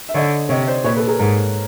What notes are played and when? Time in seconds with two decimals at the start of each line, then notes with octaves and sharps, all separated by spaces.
0.09 E5
0.15 D3 C#5 D#5
0.49 C3 C#5 D#5
0.67 C5 D5
0.84 A#2 B4 C#5
0.96 A4 B4
1.07 G#4 A#4
1.19 G#2 G#4 A#4